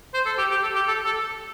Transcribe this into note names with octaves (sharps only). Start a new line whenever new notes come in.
C5
A4
G4
G4
A4
G4
A4
A4